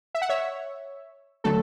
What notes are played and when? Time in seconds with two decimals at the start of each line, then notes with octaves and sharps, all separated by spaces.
0.15 E5
0.22 F#5
0.29 C#5 E5
1.44 D3 F#3 A3 A4